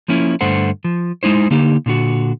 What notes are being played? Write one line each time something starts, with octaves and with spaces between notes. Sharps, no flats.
F3 A#3 C#4 E4
G2 D3 A3 C5 F#5
F3
G#3 D#4 E4 C5
D3 A#3 D#4 G4
A#2 D3 F#4